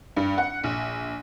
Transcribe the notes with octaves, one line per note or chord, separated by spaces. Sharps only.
G2
F#5
A#1